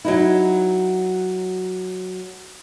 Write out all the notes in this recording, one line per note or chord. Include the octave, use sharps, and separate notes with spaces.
F#3 D#4 E4